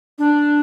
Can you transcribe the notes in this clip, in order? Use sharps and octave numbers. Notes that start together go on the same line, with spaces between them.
D4